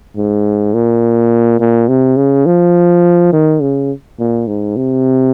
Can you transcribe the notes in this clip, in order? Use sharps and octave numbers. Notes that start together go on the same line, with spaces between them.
G#2
A#2
A#2
C3
C#3
F3
D#3
C#3
A#2
G#2
C3